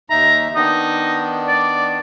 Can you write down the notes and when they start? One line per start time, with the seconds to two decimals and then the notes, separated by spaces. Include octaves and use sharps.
0.10 D#2 D#4 E5 A#5
0.56 D#3 B3 D4 D#4
1.47 D5